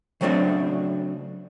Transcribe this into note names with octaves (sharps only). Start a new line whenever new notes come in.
C#3 F#3 A3 C4 D4 F#4